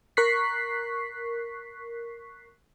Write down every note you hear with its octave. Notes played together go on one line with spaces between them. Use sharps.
A#4 C#6 F#6 B6 C7